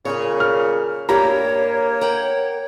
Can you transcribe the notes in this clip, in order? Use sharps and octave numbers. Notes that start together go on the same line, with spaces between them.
A#2 C#3 C#4 G#4 C#5
F6
G2 G3 A#3 G4 A4 C#5 A#5
A#4 F#5 G5